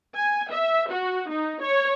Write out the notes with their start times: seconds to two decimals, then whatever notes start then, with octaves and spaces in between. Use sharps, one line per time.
0.16 G#5
0.51 E5
0.92 F#4
1.30 D#4
1.63 C#5